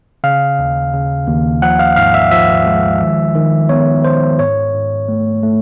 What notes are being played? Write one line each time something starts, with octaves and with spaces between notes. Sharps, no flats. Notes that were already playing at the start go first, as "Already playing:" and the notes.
C#3 F5
D#2
C#3
D#2
F3 F#5
F5
G#2 F5
E5
F3 E5
G#3
D#3
D#3
B3 C#5
B3 C5
G#2 C#5
G#2
A3
A3